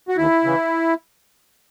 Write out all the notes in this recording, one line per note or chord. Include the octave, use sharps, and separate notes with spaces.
F#4
D#2 E4
C#3 E3